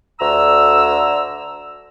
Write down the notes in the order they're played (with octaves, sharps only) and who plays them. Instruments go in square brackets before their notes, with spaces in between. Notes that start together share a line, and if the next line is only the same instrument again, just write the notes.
[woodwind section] D2 D3 A#5 E6